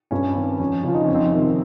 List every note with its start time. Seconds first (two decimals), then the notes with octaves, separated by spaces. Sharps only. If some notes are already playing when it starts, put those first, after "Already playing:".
0.11 G2 C#4
0.35 D#3 C4
0.60 F2 C#4
0.83 C#3 F3 F4
0.94 D#4
1.04 F2 C#4
1.14 C4 D#4
1.32 C3 D#3